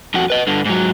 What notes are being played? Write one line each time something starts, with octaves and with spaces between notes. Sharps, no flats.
F2 F#4
B4 D#5
G2 D3
G#2 F#3